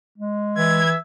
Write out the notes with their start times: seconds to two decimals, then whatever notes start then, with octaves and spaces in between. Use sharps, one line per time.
0.18 G#3
0.57 E3 E5 G#6